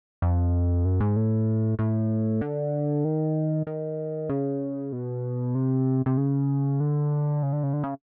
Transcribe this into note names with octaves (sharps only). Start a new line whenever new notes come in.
F2
F#2
G#2
A2
A2
D3
D#3
D#3
C#3
B2
C3
C3
C#3
D3
C#3
D3
C#3
D3
C#3